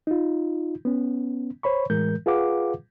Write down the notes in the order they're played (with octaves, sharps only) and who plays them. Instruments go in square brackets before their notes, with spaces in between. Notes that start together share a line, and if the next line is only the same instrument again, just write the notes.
[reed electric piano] D#4 F4
B3 C#4
C5 C#5 B5 C#6
A2 E3 G#3 A#4 G6
F4 G#4 B4 F5 F#5 D6